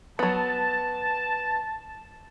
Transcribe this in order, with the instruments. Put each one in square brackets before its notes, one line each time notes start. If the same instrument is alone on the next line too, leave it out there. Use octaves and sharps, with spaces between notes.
[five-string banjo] F#3 B3 [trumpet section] A5